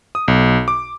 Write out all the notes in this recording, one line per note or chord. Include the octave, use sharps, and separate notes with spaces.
D#6
B1
D6